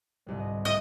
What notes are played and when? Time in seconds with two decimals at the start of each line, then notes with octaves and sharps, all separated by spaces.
0.26 G1 C2 G#2
0.40 D#5
0.65 A2 D#5